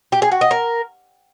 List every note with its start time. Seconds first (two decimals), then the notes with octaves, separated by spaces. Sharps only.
0.12 G4
0.22 G#4
0.32 F#4
0.41 D#5
0.51 A#4